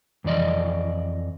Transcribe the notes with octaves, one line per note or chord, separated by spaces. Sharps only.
F2 E3 D5 D#5